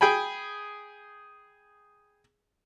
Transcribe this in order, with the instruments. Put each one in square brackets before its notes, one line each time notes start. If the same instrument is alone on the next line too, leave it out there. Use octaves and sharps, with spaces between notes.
[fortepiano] G#4 G5 G#5 B5